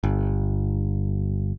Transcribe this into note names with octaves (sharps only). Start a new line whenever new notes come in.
G1